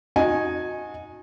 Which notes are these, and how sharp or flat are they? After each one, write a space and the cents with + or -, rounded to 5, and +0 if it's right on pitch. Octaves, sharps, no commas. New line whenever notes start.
D#4 +0 F#4 -30 G#5 +0